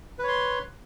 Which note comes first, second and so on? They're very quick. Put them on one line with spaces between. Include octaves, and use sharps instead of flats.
B4 C#5 C6